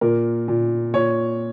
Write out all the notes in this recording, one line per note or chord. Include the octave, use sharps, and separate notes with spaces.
A#2 A#4
A#2
A#2 C#5